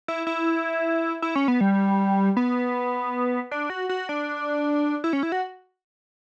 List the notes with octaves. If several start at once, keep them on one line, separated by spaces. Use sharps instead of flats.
E4
E4
E4
C#4
B3
G3
B3
D4
F#4
F#4
D4
E4
C#4
E4
F#4